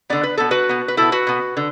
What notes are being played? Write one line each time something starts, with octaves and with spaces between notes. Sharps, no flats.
D3 B3 D5
B4
B2 B3 A4
F#4 B4
B2 B3
B4
B2 B3 E4 A4
F#4 B4
B2 B3
D3